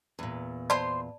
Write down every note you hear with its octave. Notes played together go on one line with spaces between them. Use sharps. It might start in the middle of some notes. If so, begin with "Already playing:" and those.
E2 A#2
C5 D5 A5 B5 C6